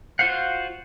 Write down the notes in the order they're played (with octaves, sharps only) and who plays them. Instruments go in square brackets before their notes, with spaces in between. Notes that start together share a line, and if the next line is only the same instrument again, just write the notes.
[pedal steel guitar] F4 F#4 C5 F5 F#5